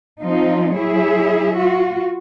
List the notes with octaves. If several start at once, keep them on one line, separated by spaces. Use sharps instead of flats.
F3 C4 D#4 F4
F#3 E4 G#4 C#5 E5
F4 F#4